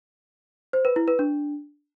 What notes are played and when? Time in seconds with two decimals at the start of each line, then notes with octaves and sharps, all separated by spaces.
0.73 C5
0.85 B4
0.96 E4
1.08 B4
1.19 D4